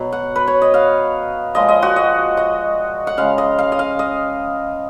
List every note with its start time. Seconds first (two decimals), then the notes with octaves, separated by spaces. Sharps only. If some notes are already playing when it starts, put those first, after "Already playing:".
Already playing: B2 F#3
0.12 F#5
0.36 B4
0.47 C#5
0.62 D#5
0.74 F5
1.55 A#2 F3 G#3 D#5
1.68 D#5
1.82 F#4
1.96 D#5
2.37 D#5
3.07 F#5
3.17 C#3 G#3 F5
3.38 D#5
3.59 F5
3.72 D#5
3.79 F5
3.99 D#5